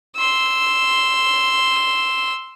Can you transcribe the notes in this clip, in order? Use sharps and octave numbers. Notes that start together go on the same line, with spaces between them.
C6 E6